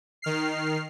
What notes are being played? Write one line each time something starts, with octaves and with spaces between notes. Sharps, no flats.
D#3 F6 C7